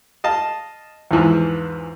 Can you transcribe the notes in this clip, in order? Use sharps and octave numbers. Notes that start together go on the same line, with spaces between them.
D#5 F5 A5
E2 G#2 E3 F3